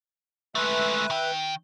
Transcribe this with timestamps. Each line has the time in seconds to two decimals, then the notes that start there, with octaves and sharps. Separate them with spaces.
0.55 G#3 A3 B4 E5
1.10 D#3 G5